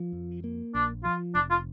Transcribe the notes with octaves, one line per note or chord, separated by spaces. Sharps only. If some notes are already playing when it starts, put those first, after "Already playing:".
Already playing: F3
F2
A#3
A#1 D4
F3 F4
F1 D4
F4